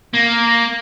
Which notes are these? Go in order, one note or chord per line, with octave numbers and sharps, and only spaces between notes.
A#3